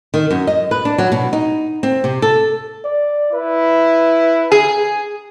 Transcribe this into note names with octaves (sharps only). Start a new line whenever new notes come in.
D#3
F#2
D#5
B4
D4
F#3
B2
D#4
C4
C3
A4
D5
E4 B4
G#4 G#5